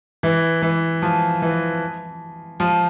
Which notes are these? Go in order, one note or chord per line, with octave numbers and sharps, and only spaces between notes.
E3
E3
F3
E3
F3